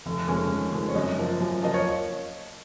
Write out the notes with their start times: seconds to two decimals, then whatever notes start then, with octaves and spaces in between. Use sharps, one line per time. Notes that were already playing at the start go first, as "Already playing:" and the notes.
0.06 F1
0.28 F2 D#3 G#3 C#4
0.50 F1
0.73 F2 D#3 G#3 C#4
0.88 C#5
0.95 F#2 D#5
1.18 F3 A#3
1.40 F#2
1.62 F3 A#3 D#5
1.74 C#5